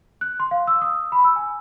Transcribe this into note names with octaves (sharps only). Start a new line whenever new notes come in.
F#6
C6
F5
E6
D#6
B5
E6
G#5